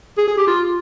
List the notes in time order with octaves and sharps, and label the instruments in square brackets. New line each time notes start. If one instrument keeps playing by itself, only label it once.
[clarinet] G#4
G#4
G4
F4